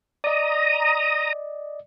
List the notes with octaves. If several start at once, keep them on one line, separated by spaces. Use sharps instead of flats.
D5 D#5 A#5 D#6